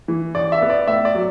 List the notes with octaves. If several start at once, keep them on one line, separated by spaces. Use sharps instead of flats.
E3
A1 D5
E5
B3
D5
A2 E5
D5
F#3